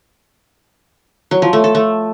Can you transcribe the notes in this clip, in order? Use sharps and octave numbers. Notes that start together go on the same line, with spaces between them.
F#3
F3
A3
A4
A3